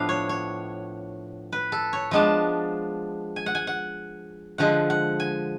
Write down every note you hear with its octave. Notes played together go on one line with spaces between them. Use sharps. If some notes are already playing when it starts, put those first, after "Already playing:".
Already playing: A2 F3 B3 D4 F5
C#5
C#5
B4
A4
C#5
F3 G#3 B3 D4 A5
G#5
F#5
G#5
F#5
D3 F3 G#3 F#5
F#5
G#5